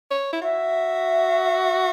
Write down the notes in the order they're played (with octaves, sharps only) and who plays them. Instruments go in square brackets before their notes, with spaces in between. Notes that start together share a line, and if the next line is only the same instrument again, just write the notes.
[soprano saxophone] C#5
E4
[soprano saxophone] F#4 [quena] E5